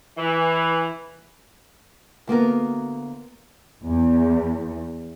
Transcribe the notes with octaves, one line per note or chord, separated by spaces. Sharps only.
E3
D2 A#3 B3 A#4
E2